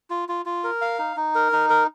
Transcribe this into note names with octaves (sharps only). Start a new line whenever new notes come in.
F4
F4
F4
A#4
F5
D#4
D#4
A#4
D#4
A#4